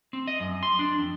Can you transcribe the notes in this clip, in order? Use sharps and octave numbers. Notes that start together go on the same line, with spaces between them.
C4
D#5
F#2
C6
D4
F2